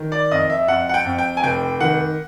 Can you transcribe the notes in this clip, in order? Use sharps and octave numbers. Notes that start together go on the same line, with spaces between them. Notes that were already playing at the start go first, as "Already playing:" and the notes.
Already playing: D#3
D5
F2 D#5
E5
F2 F#5
F#5
G5
F2
G5
G#5
F1 G5
D#3 F#5